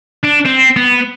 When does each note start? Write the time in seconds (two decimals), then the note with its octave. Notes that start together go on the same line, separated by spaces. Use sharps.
0.23 D4
0.45 C4
0.77 B3